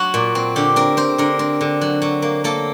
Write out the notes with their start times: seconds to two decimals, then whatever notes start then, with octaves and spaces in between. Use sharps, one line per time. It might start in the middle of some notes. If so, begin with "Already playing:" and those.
Already playing: F#3 F#4
0.14 A#2
0.35 C4
0.56 D3 G4
0.76 C4 A#4
0.97 C4 C5
1.18 D3 A#4
1.39 C4
1.61 D3
1.81 F#3
2.02 F#3
2.22 A#3
2.44 A#3 A4